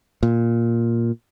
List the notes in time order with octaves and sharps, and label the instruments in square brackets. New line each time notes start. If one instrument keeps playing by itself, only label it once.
[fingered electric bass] A#2